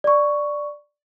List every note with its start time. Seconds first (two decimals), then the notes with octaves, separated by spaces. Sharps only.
0.04 D5 C#6